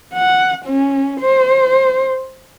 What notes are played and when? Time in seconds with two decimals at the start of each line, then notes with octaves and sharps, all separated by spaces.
0.14 F#5
0.66 C#4
1.20 C5